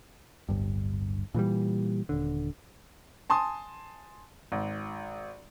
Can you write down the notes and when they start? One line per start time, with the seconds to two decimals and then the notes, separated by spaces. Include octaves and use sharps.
0.49 D1 G1 G2
1.34 A#2 E3 F#3 G3
2.09 D#1 D3
3.30 G#5 A5 C6 D#6
4.52 G#1